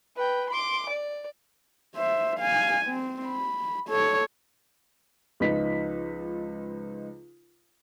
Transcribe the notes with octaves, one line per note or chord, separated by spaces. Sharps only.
B4 G5
C6 D6
D5
C5 E5
F5 G#5
C4
B5
A4 C#5
C#2 F3 D#4 F4 B4 B6